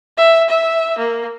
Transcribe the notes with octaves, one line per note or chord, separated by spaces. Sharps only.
E5
E5
A#3